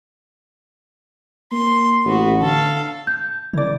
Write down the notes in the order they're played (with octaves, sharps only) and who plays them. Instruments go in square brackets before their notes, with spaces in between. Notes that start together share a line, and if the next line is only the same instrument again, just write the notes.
[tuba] A#3 [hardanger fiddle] C6
[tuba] A1 [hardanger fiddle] B3 F#4
[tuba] D3 [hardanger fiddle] A4 F5
[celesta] G6
[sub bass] C#3 [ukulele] E4 D5